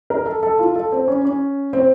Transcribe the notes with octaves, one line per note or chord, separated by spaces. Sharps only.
A#4
A4
A4
F4
A4
C4
C#4
C#4
C4